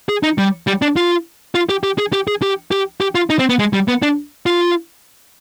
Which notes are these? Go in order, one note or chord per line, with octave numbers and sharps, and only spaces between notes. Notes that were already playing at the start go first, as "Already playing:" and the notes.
G#4
D#4
G3
G3
D4
F4
F4
G4
G4
G#4
G4
G#4
G4
G4
G4
F4
D#4
C4
B3
G#3
G3
B3
D4
F4